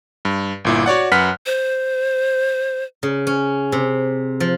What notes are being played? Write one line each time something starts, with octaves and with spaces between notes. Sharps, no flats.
G2
G1 A#2 E4
F#4 C#5 D5 F#5
F#2 B4 F#5 F6 F#6 B6
C5
C#3
C#4
C3
F3